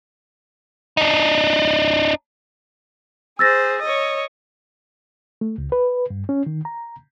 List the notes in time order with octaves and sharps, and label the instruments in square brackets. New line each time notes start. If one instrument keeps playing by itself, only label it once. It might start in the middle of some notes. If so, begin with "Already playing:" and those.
[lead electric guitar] D4 D#4
[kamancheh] G#4 C5 [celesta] E6 A6 A#6
[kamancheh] C#5 D#5
[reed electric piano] A3
C#2
B4
G2
C#4
D#3
A#5